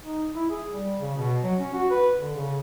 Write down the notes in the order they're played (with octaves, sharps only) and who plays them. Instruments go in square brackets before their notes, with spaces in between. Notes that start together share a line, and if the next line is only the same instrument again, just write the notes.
[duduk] D#4
E4
G#4
G3
C#3
B2
F#3
C#4
F#4
B4
D3
C#3